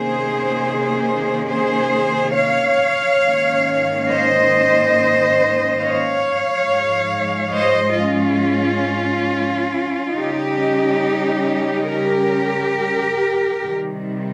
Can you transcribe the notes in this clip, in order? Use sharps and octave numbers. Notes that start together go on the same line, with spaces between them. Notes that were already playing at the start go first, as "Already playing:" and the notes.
Already playing: C3 D#3 A#3 C#4 G#4 C5
G#4 C5
C#5 F5
G#2 D#3 A#3 C#4
C5 D#5
C#5 F5
G#2 F3 G#3
C5 D#5
C#4 F4
C#3 G3 C#4 D#4 G4
G4 A#4
C3 D#3 G3